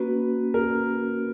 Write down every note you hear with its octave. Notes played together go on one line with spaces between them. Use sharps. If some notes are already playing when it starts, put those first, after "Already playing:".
Already playing: A#3 C#4 F#4 B4
A#4